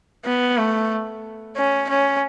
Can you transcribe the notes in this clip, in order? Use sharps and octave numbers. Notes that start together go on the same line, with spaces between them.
B3
A3
C#4
C#4